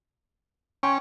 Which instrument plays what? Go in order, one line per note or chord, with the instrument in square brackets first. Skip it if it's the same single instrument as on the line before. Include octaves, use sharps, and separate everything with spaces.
[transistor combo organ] C#4 [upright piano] G5 G#5 C6